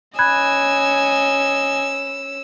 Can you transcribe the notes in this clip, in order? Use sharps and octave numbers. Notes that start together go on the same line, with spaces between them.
C#4 D#5 G#5 B5 E6 F#6 G#6